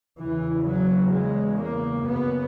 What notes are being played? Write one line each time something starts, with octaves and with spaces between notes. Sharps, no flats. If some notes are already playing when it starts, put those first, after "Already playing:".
E2 C#3 E3
F#3
G#3
A#3
F#2 C#3 B3